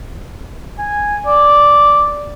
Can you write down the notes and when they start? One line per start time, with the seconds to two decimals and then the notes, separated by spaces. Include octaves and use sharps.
0.78 G#5
1.26 D5